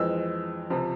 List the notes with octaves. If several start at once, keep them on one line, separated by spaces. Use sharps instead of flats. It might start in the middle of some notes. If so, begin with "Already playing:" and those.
Already playing: F2 E3 G#3 C4 E6
C#2 C3 F3